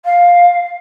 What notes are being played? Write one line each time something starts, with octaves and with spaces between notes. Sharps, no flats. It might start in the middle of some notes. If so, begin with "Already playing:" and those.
F5